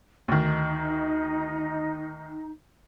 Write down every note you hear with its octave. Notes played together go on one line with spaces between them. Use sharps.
D2 D#3 D#4